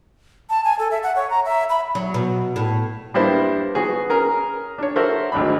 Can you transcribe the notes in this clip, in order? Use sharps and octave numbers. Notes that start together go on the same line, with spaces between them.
A5
G#5
A4
E5
F#5
C#5
A#5
E5
B5
F#3
B2
A2
G3 A#3 B3 D4 E4 C5
B3 F#4 G#4
C#4 G#4 A#4 A#5
D4 C#5
F#4 A4 A#4 C5 E5
G#1 D2 D4 B5